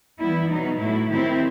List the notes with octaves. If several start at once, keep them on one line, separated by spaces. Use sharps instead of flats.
E3 G3 B3 E4
B2 F#3 B3 D#4
A2 F#3 A3 E4
D#3 F#3 C4 E4 G4